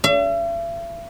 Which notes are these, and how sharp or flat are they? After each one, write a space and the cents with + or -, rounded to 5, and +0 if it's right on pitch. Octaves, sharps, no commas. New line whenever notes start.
E5 +45